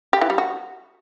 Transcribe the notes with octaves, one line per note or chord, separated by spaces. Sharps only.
G4
E3
G3
F#4